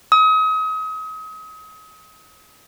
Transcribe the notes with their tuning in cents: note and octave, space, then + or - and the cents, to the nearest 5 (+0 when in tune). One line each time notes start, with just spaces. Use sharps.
D#6 +35